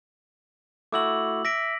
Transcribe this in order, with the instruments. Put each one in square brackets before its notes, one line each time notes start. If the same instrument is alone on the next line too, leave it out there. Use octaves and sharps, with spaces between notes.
[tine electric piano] A3 E4 F#4 [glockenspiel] D6 E6 F#7
[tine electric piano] E5 [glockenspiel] A#6 B6 D7